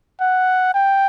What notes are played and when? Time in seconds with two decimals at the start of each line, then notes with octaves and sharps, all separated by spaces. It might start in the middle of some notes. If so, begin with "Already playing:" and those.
0.21 F#5
0.74 G5